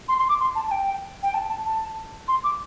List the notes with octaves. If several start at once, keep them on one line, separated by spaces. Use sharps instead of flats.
C6
C6
D6
C6
A5
A5
G5
G5
A5
A5
A5
C6
D6